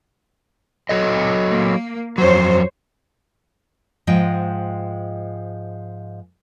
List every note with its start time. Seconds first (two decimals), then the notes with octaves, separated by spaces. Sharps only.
0.89 F#3 A4 D#5
1.49 A#3
2.18 F2 F#3 C5 C#5
4.07 G#2 F3 G#3 D#5 G5